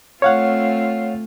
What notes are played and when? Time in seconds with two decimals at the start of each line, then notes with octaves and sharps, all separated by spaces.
0.22 A3 C4 F4 C#5 F5 F#5